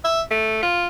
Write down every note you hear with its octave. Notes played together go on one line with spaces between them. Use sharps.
E5
A3
F4